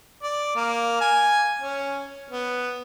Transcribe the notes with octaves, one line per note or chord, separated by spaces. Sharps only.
D5
A#3
G#5
C#4
B3